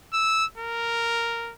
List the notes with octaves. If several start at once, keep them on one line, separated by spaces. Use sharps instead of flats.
E6
A#4